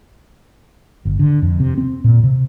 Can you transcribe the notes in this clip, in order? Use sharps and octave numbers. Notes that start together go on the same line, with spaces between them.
G1
D3
F2
C3
C4
A#2
C3